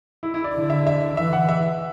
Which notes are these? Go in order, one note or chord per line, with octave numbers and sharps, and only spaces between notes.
E4
E4
D5
D3
E5
E5
E3 E5
F#5
E5